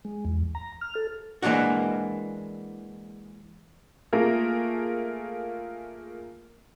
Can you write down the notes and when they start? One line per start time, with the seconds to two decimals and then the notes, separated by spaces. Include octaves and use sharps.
0.05 G#3
0.25 E2
0.55 A#5
0.81 F6
0.95 A4
1.42 E3 G#3 A#3 D4 F#4
4.13 A3 A#3 F4 G#4 A#4